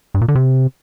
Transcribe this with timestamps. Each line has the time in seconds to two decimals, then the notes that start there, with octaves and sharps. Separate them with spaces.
0.14 G2
0.21 A#2
0.28 D3
0.35 C3